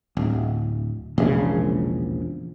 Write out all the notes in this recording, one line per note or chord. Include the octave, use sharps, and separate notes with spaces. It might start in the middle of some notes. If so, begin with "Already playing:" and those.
D1
E1 A#1 C#3 A#3